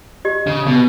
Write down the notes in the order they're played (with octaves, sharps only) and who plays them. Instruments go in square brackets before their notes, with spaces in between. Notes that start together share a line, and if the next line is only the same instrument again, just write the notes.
[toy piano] G4 D#5
[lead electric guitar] C#3
B2